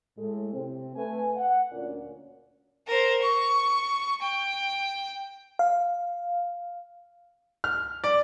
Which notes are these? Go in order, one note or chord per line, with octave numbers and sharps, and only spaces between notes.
A2 G#3 A4
C3 C4
A3 B4 G#5
F#5
D2 A#2 C#4 F4 A#4 D5
A#4 C5
C#6
G5
F5
F6
D5